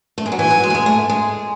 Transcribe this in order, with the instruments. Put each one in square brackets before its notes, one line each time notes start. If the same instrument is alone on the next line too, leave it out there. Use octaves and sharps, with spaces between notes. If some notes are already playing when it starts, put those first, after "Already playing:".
[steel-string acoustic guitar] A3
G#3
F#3
[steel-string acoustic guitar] E3 [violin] G#5
[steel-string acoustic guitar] F#3
G#3
A3
G#3
A3
G#3